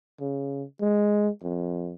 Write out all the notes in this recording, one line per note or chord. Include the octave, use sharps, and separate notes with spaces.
C#3
G#3
F2